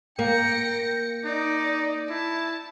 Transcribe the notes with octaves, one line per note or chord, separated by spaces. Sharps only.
A#3 G5 A#6 C#7
D#4 D5
E4 A5